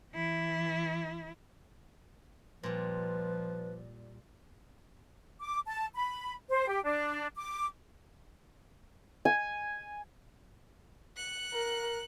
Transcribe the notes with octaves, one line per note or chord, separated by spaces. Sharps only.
E3 E4
A#2 F3 G3 B4
D6
A5
B5
C5
G4
D4
D6
G#5
F#6 C#7
A#4